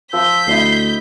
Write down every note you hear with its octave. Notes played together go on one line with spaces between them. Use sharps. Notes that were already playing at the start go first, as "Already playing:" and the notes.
F3 C5 E6 G6 B6
D2 E4 D#5 E6 C7